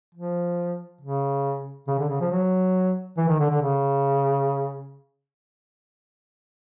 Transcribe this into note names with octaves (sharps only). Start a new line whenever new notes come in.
F3
C#3
C#3
D3
C#3
F3
F#3
E3
D#3
D3
D3
C#3